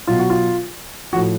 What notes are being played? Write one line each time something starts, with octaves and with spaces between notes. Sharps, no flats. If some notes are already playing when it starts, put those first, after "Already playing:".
B2 F#3 F4
F#4
F4
A2 F3 F#4